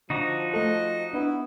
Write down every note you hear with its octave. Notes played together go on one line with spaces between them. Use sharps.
D3 F3 D4 D#4 F#4 A#5
A3 A4 D#5
B3 D4 E4